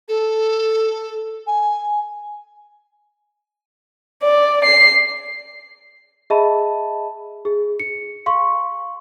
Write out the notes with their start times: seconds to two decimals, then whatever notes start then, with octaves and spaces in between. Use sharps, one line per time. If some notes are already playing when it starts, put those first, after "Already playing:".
0.09 A4
1.47 G#5
4.23 D5
4.64 C7
6.30 G#4 D#5 E5 A5 B5
7.45 G#4
7.80 C#7
8.26 F5 C6 C#6